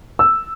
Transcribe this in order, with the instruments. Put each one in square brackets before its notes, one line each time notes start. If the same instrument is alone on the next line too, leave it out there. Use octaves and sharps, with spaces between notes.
[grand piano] E6